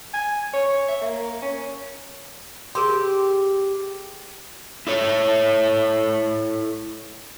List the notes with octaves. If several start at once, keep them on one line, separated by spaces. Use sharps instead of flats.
G#5
C#5
E5
A#3
C#4
G4 G#4 A#4 C6
E4 A4 C#5